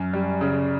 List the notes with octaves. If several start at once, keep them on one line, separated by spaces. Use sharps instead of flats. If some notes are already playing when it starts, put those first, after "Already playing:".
Already playing: F#2
G3
C#3